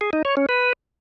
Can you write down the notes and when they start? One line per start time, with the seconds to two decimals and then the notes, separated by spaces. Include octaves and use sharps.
0.01 G#4
0.13 D#4
0.25 C#5
0.37 C#4
0.49 B4